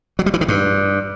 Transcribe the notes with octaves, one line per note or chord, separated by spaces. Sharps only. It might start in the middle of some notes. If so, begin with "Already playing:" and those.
F#3
G3
E3
D#3
G2